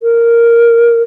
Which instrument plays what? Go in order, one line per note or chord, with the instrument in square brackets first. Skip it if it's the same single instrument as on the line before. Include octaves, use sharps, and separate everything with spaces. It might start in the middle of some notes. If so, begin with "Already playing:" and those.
[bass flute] A#4